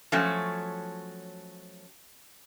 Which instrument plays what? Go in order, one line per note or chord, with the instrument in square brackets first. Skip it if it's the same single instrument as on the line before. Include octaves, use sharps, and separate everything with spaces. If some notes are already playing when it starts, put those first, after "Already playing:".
[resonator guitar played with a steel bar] F3 F#3 A3 C#4 F#4